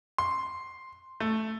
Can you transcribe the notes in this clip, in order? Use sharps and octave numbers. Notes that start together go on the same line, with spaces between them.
C6
A3